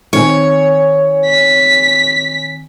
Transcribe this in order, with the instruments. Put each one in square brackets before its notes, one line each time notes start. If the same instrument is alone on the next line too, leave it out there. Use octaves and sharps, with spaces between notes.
[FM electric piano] D#3 C4 G#5 [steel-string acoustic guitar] C#5
[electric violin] B6